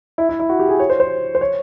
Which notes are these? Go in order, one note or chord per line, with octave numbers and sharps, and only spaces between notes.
E4
E4
E4
F#4
G4
G#4
C#5
C5
C5
C5
C#5